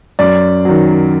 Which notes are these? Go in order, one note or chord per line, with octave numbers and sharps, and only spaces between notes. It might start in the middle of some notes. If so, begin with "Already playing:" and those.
F#2 D5
D#3 F#3